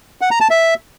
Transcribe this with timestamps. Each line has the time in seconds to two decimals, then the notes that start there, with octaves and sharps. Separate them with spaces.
0.21 F#5
0.31 A#5
0.41 A5
0.50 E5